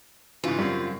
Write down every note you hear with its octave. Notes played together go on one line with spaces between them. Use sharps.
G#2 C#3 E3 F4
F#2 C#3 G3 C4